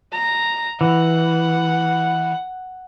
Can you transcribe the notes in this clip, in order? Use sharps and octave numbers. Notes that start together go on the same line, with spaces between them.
A#5
E3 F#5